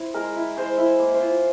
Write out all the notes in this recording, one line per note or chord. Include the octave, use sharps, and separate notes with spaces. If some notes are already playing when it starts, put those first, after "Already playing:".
Already playing: E4 C5
G#3 A#4
E4
G#3 C5
E4
A#3
C5
F4